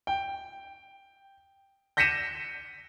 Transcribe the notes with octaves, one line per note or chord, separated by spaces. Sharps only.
G5
G6 A#6 B6 C#7 D#7 E7